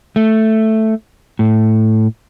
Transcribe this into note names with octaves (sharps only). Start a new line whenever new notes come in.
A3
A2